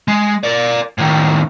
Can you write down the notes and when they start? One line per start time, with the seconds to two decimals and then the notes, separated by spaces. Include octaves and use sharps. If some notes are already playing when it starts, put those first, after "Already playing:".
0.08 G#3
0.44 A#4 D5
0.98 A2 D#3